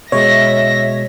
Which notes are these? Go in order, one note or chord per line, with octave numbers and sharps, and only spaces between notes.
B2 G#3 C#5 E5 A#6